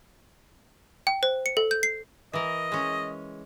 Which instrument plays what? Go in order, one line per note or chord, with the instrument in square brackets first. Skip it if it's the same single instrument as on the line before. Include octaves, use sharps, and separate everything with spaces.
[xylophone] G5
C5
C#7
A4
G6
C7
[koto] E3 A#4 [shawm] D#5
[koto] G#3 C#4